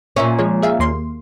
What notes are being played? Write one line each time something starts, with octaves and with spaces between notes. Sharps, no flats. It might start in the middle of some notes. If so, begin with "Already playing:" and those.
A#2 C#4 C#5 E5
F3 G#3 C#5
G#4 E5 F5
D#2 A#3 C6